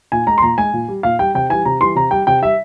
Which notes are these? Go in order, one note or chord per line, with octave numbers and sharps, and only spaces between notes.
A#2 G#5
G#3 A#5
C6
A#2 A#5
G#3 G#5
A#2
G3
A#2 F5
G3 G5
C3 G5
E3 G3 G#5
C3 A#5
E3 G3 C6
C3 A#5
G3 G5
C3 G5
G3 E5